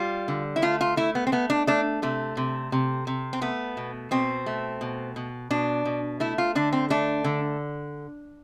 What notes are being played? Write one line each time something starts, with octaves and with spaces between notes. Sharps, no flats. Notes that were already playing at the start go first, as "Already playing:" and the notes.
Already playing: G3 F4
D3
E4
A3 F4
F4
A3 E4
B3
C4
A3 B3
D4
A3 D4
C3 A3
C3
C3
C3
C4
A3 B3
B2
B2 C4
A3
B2
B2
B2 D4
B2
A3 E4
F4
D3 D4
C4
A3 D4
D3